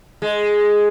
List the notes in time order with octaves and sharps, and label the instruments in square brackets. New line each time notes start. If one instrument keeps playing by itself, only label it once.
[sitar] G#3